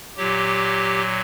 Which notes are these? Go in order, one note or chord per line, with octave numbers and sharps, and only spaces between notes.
A#2 F#3 G4